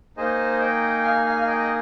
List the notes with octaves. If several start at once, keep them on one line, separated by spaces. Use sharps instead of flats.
A#3 D#4 G#4 C5 D#5
D#5 G5
F5 G#5
F5 G#5
F5
D#5 G5
G5